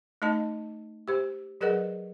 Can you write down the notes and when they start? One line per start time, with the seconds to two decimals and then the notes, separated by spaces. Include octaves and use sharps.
0.22 A3 D#4 D#5 A5
1.08 G4 C5
1.61 F#3 G#4 A#4 B4 D#5 F#5